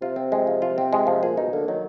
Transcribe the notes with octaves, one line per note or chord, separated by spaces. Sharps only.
C3 F4
C4
G#3
F3
F4
C4
G#3
F3
A#2 G#4
B2 D#4
D3 A#3
D#3 F#3